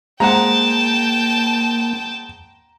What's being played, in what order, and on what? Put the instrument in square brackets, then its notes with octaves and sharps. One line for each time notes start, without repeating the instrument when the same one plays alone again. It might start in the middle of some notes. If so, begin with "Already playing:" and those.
[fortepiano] G#3 C5 F#5 [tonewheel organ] A#3 [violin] G5 A5 [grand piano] A#5